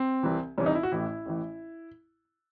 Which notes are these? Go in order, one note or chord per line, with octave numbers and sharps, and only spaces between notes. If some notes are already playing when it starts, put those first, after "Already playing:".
Already playing: C4
C2 C3 E3
C2 C3 E3 C#4
D#4
E4
F#4
A1 A2 E3 E4
A1 A2 E3